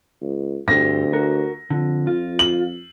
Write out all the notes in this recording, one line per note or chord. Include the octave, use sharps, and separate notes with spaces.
C#2
D2 G2 C4 G4 A#6
F#4 A#4
F2 D3
F4
F#7